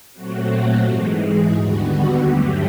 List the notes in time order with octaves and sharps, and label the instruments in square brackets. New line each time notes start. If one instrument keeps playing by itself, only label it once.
[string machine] A#2 F#3 A3 C4 F#4
G#2 E3 G#3 G4
G#4
D#2 D3 G3 B3 F#4
G2 D3 F#3 A3 G4